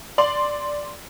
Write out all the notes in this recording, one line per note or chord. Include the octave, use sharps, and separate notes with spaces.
D5 C6 F#7